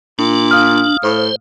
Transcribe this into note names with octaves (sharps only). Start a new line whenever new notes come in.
A#2 D4
F5 D#6 F6
A2 C5